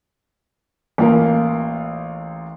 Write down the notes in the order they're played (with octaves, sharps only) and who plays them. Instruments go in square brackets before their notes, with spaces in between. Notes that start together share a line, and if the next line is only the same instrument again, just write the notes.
[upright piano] A1 F4 A#4 [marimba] A#3